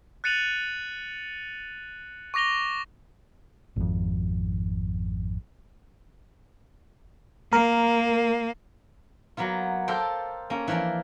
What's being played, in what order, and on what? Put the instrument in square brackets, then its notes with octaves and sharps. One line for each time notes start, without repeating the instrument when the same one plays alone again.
[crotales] F#6 A6 C#7 D#7 F7 F#7
C#6 D6 A#6 F7 G7
[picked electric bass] G#1 F2
[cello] A#3 [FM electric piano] A#4
[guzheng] F#3 A#3 B3 F4
F4 G4 A4 A#4 C5 G5
A#3 C#4
E3 F3 A#3 A#4 D5